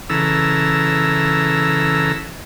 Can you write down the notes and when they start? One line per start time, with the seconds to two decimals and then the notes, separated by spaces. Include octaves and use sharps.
0.10 C#3 E3 A4 A#5 E6